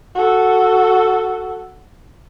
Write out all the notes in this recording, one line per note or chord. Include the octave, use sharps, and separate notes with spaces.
F#4 A4